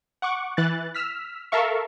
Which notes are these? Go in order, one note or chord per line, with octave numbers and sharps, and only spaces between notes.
F#5 C#6 D6
E3 F#6 A6
E6 F6 B6
A4 A#4 E5 F5 C#6